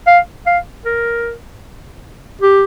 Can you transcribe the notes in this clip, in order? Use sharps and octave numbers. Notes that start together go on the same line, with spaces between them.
F5
F5
A#4
G4